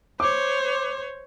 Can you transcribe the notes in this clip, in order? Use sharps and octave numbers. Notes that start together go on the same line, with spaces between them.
C5 C#5 D6